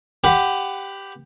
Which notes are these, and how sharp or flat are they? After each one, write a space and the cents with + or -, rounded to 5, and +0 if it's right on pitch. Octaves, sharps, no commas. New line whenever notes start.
G4 +0 B4 +25 F#5 +0